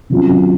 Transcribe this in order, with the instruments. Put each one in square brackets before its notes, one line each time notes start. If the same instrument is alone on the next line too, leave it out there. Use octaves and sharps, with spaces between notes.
[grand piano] C3 F#3 C#4 F4